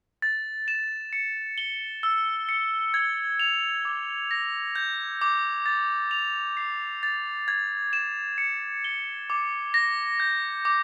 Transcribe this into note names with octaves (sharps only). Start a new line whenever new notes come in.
A6
E7
C#7
G7
E6
C#7
G#6
F7
D6
A#6
G6
D6
A6
F7
C7
A6
G#6
E7
C#7
G7
D6
A#6
G6
D6